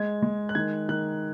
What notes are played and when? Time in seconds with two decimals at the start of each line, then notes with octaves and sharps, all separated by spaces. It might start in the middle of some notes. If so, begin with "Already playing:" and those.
Already playing: G#3 G#6
0.22 G#3
0.49 F#6
0.55 D#3 G#6
0.89 D#3 F#6